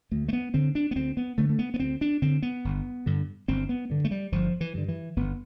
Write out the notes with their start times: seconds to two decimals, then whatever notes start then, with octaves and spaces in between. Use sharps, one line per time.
0.11 D2 A3
0.28 A3
0.33 B3
0.54 D3 C4
0.75 D4
0.91 B3
0.96 D2 C4
1.17 B3
1.38 D3 A3
1.49 A3
1.59 B3
1.74 B3
1.80 D2 C4
2.01 D4
2.22 D3 C4
2.42 B3
2.65 G1
3.06 G2 D3
3.48 G1 C4
3.69 B3
3.90 G2 D3
4.05 A3
4.11 G3
4.32 G1 F3
4.61 E3
4.75 G2 D3
4.88 E3
5.16 G1 B3